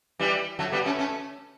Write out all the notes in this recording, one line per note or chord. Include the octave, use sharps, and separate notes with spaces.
E3 G3
F#3 A3
G3 B3
A3 C#4
A3 C#4